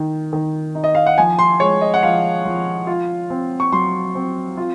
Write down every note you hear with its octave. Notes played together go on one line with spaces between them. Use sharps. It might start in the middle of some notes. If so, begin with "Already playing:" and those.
Already playing: D#3
D#3
D#4
D#5
F5
F#5
F3 G#5
C6
G#3 C#5
D#5
F#5
F3 F5
F3
F4
C4
C#6
F#3 C6
C4
F4